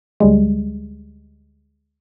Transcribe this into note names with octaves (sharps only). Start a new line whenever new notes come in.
D2 G3 G#3